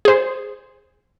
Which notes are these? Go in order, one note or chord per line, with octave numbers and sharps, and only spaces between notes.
G#4 C5